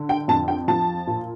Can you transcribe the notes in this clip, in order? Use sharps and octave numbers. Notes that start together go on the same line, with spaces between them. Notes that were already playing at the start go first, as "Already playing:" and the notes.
Already playing: D3
G5
F2 A5
G5
F3 A5
A#2